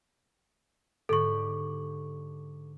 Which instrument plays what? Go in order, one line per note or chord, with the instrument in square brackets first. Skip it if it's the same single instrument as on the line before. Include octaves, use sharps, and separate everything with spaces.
[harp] G#2 D3 G4 [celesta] A4 C#6